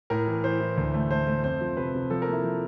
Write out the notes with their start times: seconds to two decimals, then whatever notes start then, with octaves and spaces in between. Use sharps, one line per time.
0.10 A2 A#4
0.27 E3
0.44 E3 C5
0.60 E3
0.77 D2
0.94 A3
1.11 A3 C5
1.27 A3
1.44 F2 C5
1.61 F3
1.77 C3 B4
1.94 C3
2.10 F3 A4
2.22 A#4
2.27 A#3
2.33 E4
2.44 F3